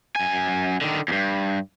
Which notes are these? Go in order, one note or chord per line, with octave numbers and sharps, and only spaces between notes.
F#2 G#5
D3 D#3
E2 G2